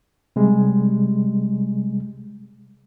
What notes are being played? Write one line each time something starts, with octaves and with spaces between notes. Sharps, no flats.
C3 G3 G#3